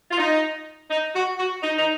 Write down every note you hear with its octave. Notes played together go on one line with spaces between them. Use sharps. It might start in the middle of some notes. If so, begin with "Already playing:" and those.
F4
D#4
D#4
F#4
F#4
D#4
D#4